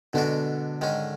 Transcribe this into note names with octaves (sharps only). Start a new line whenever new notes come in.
B2 D3 G#3 B3 D4 F#4
G#2 D#3 G#3 C#4